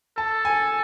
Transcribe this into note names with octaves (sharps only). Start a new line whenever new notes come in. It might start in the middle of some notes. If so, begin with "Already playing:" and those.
A4 A5
G#5